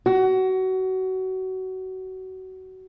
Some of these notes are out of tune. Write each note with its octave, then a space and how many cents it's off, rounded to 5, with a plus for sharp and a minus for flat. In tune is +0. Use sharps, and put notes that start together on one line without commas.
F#4 +25